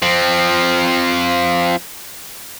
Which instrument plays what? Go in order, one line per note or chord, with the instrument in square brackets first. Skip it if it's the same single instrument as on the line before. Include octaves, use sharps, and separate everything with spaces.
[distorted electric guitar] F3 C4